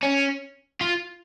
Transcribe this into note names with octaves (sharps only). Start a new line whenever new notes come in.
C#4
F4